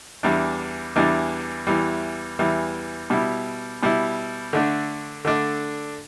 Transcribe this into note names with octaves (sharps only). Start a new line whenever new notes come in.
E2 E3 G3 D4
E2 E3 G3 D4
E2 E3 G3
E2 E3 G3
B2 G3 E4
B2 G3 E4
D3 A3 D4
D3 A3 D4